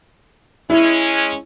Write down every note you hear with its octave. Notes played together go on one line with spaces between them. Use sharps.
G#3 C#4 E4